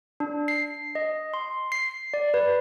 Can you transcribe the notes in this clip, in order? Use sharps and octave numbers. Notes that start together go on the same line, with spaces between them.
D4
C7
D#5
C6
C7
D5
B4